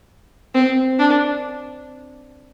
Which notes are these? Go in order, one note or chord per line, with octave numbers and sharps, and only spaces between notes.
C4
D4